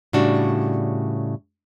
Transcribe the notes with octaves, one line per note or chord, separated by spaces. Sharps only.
A2 C#3 G3 D4 F#4